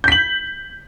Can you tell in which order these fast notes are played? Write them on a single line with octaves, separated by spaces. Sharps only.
G6 B6 F#7